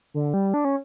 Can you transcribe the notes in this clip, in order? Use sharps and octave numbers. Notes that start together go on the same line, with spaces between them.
D3
G3
D4
C#4